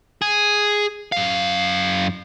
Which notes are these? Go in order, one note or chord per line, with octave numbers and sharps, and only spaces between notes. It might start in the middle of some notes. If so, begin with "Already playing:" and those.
G#4
F#2 F5